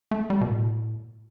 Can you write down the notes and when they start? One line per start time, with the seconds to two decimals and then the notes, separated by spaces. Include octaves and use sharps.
0.11 A3
0.30 G3
0.41 B2
0.50 A2